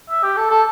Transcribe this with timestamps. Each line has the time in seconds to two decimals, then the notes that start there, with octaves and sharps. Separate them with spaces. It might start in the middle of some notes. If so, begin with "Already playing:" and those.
0.10 E5
0.23 G4
0.37 A4
0.50 A4